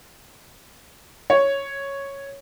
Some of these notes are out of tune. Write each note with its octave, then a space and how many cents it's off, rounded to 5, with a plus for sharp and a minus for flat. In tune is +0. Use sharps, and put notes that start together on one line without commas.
C#5 -5